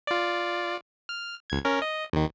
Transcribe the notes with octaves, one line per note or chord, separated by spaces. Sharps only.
F4 D5
F6
C#2 G#6
C#4 A#4
D#5
D#2 D#3